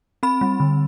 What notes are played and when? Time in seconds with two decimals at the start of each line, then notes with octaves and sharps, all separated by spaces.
0.23 C4 B5
0.41 G3
0.60 D3